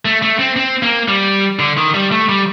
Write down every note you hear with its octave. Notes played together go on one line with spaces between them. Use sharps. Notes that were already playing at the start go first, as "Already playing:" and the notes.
A3
A3
C4
C4
A#3
G3
D3
D#3
G3
A3
G3